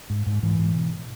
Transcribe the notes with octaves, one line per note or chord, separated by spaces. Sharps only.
G#2
G#2
G#2 E3
G#2
B2